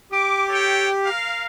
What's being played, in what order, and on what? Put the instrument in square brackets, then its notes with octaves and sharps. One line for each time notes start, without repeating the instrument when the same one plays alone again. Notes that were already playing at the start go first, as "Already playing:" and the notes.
[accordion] G4 [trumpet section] D6
[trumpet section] A4 C#5 G5
A#4 F5